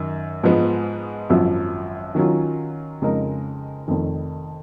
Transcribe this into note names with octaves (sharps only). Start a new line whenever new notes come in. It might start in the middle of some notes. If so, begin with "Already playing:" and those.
Already playing: F#2 D#3
G#2 F3 G#3 B3
G#1 F#2 F3
D#3 F#3 C#4 F4
F2 C#3 G#3 D#4 A#4
F1 F2 D#3